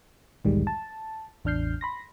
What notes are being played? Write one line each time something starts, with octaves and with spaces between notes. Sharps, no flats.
B1 E2 G#2 D#3 G3 G#3
A5
A1 E2 D4 F6 G6 C7
B5 C6 A#6